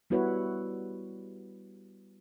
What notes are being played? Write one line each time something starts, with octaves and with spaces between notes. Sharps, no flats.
G3 B3 E4 F#4 B4 C#5